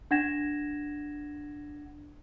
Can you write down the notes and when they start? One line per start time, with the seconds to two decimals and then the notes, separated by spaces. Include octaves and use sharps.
0.11 D4 F#5 G#6 A#6 E7